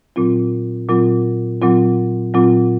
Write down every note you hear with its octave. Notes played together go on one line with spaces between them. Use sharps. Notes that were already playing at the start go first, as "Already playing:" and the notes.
A#2 F#3 C4 F4
A#2 F#3 C4 F4
A#2 F#3 C4 F4
A#2 F#3 C4 F4